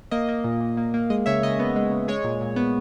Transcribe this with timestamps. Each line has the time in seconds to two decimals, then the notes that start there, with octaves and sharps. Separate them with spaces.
0.11 A#3 D#5
0.29 A#3
0.44 A#2
0.60 A#2
0.77 A#3
0.94 A#3
1.10 G#3 D#5
1.26 C#3 C#5 E5
1.43 C#3 D#5
1.59 B3
1.76 G#3
1.91 C#3
2.08 G#3 C#5
2.24 A#2
2.41 A#2
2.56 B3